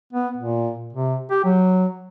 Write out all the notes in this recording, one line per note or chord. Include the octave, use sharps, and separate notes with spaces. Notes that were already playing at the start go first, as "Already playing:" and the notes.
B3
A#2
C3
G4
F#3